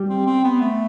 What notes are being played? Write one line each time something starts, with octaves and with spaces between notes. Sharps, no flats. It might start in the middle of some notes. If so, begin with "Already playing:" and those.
Already playing: G3 G4
C4
C4
B3
A3